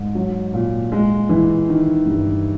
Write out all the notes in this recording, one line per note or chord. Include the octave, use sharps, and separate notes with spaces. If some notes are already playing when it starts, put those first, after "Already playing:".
Already playing: G#2
F#3
A#2
G#3
E3
D#3
G2